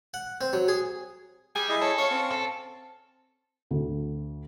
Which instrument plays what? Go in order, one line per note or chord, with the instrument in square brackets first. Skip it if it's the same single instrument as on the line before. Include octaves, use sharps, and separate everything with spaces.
[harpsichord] F#5
C4
F#3
G#4
[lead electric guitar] G3 [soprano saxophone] G#5
[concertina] E4 G#4 D#5
[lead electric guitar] A4 [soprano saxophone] C#5
[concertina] C#4 F5 C#6 [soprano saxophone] C#5
[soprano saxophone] C4
[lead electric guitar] A4
[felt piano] D2